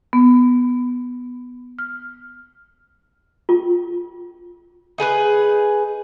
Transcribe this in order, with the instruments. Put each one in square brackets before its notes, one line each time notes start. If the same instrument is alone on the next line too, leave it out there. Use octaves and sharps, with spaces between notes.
[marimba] B3
F6
[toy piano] F4
[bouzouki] D#4 G#4 A#4 B4